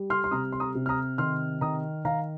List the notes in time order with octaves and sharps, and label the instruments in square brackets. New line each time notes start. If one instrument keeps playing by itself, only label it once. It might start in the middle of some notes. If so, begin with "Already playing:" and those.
Already playing: [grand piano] G3
C6 F6
C6
C3 A#5 D#6
C6
A#5 D#6
C3
F6
A#5 D#6
D#3 C6 F6
D#3 A#5 D#6
D#3 F5 A#5